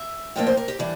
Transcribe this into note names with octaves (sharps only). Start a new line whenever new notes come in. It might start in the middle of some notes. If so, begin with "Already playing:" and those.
Already playing: E5
A2 F3 A#3 D4 G5
C5
A#4
G4
E3 G3 D4